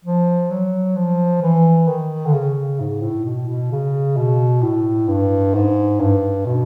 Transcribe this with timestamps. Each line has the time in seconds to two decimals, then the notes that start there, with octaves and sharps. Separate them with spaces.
0.05 F3
0.50 F#3
0.96 F3
1.42 E3
1.87 D#3
2.26 D3
2.33 C#3
2.80 G#2
3.02 A2
3.25 B2
3.48 B2
3.72 C#3
4.17 B2
4.62 A2
5.08 G2
5.55 G#2
6.00 G2
6.46 B2